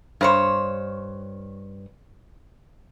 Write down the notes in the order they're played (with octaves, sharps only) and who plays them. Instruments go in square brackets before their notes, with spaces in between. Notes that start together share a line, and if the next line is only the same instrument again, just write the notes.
[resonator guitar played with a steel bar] G2 C5 C#5